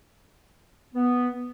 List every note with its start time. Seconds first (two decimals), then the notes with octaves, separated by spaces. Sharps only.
0.95 B3